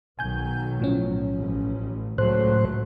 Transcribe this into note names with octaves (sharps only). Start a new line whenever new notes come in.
B1 D#3 F#3 G#5 G6
A2 F3 C#4
A1
C#2 A2 F#3 A3 C5 F#6